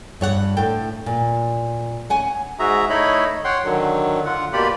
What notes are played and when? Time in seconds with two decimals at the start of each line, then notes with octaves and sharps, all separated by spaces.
0.21 G2 C#5 F#5
0.57 A2 A4 G5
1.06 A#2
2.10 C#4 F#5 G#5
2.59 G#2 F#4 G#4 E5 A#5
2.90 A3 D#4 E4 C#5 D#5 B5
3.44 C#5 F#5 G5 C6
3.64 D3 D#3 F#3
4.25 D3 F4 F#5
4.53 B2 A#3 F4 G4 D5 B5